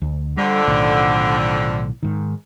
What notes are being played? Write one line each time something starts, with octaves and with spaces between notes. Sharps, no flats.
D2
F2 D3 G3
B1 A2 D#3
G#2 D#3